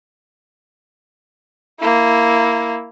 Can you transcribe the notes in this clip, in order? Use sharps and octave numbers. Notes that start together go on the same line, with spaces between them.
A#3 E4